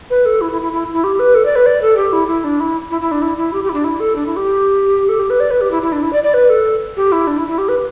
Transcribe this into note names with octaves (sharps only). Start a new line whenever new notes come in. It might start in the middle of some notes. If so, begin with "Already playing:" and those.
B4
A4
E4
E4
E4
E4
E4
G4
B4
A4
D5
B4
D5
A4
G4
E4
E4
D4
E4
E4
E4
D4
E4
E4
G4
G4
E4
D4
E4
A4
D4
E4
G4
A4
G4
B4
D5
B4
G4
E4
E4
D4
E4
D5
D5
B4
A4
G4
E4
D4
E4
E4
G4
B4